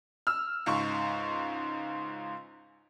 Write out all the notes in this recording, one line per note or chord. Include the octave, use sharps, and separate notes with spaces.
E6 F6
C#2 G#2 C#6